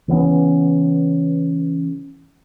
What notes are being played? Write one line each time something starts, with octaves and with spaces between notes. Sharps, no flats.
C#3 E3 B3 C#4